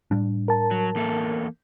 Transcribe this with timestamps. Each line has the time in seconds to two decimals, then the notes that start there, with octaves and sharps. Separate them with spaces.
0.11 A2 G3 D4
0.48 A#4 A5
0.71 F#3
0.95 E2 A#3 A4